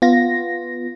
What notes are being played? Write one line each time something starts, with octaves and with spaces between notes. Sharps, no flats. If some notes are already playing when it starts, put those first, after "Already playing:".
B3 F4 A#6